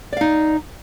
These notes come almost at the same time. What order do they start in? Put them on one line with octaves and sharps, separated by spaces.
D5 F5 D#4